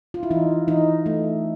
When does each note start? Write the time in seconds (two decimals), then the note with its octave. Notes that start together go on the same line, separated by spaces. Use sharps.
0.14 F4
0.23 E4
0.30 E3 D#4
0.68 E3 D#4
1.06 A3